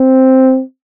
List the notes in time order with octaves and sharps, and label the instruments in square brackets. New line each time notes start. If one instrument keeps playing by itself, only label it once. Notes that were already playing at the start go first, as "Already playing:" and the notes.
Already playing: [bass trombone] C4